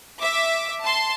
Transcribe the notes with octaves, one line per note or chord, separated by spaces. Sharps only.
E5 D6
A5 C6